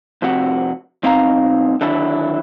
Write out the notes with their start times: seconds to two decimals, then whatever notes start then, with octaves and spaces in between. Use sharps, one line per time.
0.22 F2 C3 F#4
1.03 B1 C4 D#4 F5 A5 A#5
1.81 D3 D#3 F#3 D4 E4